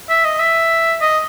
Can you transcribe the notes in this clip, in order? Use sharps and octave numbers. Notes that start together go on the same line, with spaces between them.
E5
D#5
E5
D#5